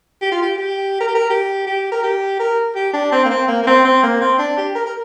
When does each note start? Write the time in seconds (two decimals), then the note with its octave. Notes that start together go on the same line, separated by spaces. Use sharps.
0.22 G4
0.32 F4
0.42 G4
0.58 G4
1.01 A#4
1.08 G4
1.15 A#4
1.30 G4
1.67 G4
1.92 A#4
2.03 G4
2.40 A#4
2.75 G4
2.94 D4
3.12 C4
3.25 A#3
3.30 C4
3.48 A#3
3.63 A#3
3.67 C4
3.85 C4
4.03 A#3
4.21 C4
4.39 D4
4.58 G4
4.75 A#4
4.86 A#4